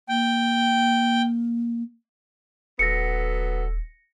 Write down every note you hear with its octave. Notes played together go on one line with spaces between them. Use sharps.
A#3 G5
D#1 F#3 B3 A4 A#6 C#7